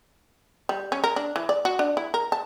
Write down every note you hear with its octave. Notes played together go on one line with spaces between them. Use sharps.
G3
C#4
A#4
D4
E3
D5
F#4
D4
E4
A#4
A5